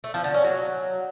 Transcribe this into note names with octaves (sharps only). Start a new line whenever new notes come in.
A3
F3
D3
C#4
F#3